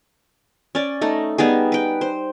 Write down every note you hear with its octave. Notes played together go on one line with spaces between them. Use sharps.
C#4 D5
A3 D#4
G3 B3 D#4 G#4
B4 G5
C5